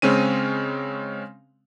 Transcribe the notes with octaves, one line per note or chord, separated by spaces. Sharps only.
C#3 G#3 C4 C#4 D#7